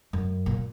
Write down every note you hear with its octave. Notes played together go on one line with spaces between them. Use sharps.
F#2
A#2